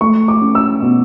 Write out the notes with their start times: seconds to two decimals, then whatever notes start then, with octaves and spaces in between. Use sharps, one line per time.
0.01 A3 C#6
0.28 D6
0.41 C#4
0.55 E6
0.82 B2